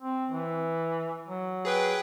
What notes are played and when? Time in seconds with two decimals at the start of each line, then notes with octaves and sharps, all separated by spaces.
0.02 C4
0.31 E3
1.28 F#3
1.65 G#4 B4 G5